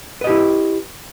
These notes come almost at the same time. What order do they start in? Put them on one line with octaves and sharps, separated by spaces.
B4 D#5 G4 E4